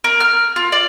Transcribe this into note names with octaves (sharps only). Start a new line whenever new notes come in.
A#4
F6
F4
D5